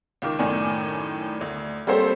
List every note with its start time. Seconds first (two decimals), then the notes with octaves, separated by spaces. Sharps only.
0.22 C#2 D#3 D6
0.39 F#2 A2 D#3 D4 G#5
1.41 D2
1.87 G3 A#3 C4 A4 C5 C#5